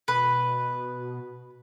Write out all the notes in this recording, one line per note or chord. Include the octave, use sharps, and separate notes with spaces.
B2 B4